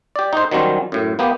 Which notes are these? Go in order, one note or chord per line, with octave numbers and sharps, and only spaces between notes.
G4 D5
D#4 C5
D#3 F#3 G3 C4 C#4
F#2 A2
A#3 B3 G4